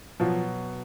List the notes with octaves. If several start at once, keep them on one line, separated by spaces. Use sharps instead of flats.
B2 F3 F#3